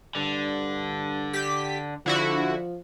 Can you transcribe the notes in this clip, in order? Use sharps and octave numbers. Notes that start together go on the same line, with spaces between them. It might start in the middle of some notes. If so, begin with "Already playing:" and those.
G2 D3
G4 B6
D3 F3 E4 F#4